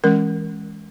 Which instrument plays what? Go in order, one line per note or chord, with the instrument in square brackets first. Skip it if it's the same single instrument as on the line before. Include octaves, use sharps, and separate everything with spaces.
[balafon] E3 G#3 C#4 A#4